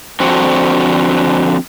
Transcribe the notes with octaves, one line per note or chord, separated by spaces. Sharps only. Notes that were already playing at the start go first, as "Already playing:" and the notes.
D3 F3 C4 F#4